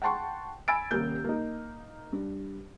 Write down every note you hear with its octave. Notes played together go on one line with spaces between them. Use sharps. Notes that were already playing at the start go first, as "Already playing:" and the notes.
F#5 G5 A5 C6 C#6
G#5 B5 E6 A6 D7
D#1 C3 G3 A#3 G6
A#3 D#4
G2